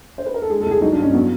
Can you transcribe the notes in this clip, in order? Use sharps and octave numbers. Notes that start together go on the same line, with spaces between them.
C5
B4
A#4
A4
G#3 G#4
A4
C2
G#4
F#3 D#4
D4
G2
C#4
F#3 B3